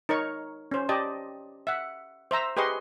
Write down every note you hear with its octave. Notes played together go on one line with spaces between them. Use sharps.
D#4 A#4 C#5 C#6
C#4 C5
G4 D5 D#5 A5
E5 F#5
C5 E5 A#5 E6
G4 G#4 B4 D#5 C6 C#6